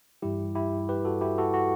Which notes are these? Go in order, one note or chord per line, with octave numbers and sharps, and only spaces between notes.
G2 E3 G3 E4 G4
E4 G4
G4 B4
F#4 A4
E4 G4
F#4 A4
F#4